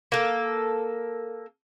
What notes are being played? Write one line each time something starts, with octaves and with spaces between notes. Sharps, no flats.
A#3 A4